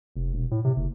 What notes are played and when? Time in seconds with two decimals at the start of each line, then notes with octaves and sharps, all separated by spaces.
0.16 F1
0.34 E1
0.51 A2
0.65 C3
0.76 F#1